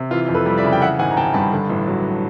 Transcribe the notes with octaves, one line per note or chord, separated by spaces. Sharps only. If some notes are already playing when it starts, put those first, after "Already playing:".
Already playing: C3
E3 F4
F2
A4 B4
G3
D5 E5
C#3
G5
E3 E5 F#5
G#1 F#5 G#5
A#5
G#1 G5 A5
G2 A5 B5
D3
A1
F#3